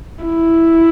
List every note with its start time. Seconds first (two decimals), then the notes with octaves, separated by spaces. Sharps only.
0.25 E4